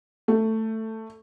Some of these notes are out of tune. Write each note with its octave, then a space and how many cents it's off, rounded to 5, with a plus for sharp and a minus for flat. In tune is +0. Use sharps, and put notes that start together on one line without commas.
A3 +10